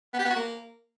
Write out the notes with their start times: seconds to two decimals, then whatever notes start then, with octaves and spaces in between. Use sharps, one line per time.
0.14 B3
0.19 G4
0.25 B3
0.30 F#4
0.36 A#3